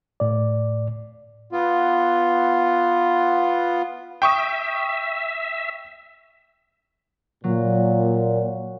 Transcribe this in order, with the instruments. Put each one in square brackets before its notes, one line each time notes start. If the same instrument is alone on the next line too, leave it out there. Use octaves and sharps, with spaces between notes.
[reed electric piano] A2 D5
[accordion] B3 F4
[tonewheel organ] E5 [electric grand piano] G5 C#6 D#6
[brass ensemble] A#2 [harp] F#3